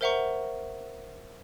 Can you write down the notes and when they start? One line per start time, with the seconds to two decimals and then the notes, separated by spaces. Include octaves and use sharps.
0.01 A#4 C5 E5 F#5 A#5 C#6